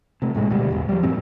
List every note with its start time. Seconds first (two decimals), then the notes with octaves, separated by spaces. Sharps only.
0.22 C3 A3
0.34 G#1 A2 D3 G#3
0.50 D2 B2 G3
0.71 A1 E2
0.89 F3 G3
1.03 F#2 A#2 C4